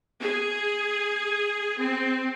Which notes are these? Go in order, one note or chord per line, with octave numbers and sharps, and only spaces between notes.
G#4
C4